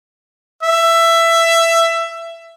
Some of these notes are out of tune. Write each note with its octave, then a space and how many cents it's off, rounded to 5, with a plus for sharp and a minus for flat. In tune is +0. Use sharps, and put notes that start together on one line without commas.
E5 +15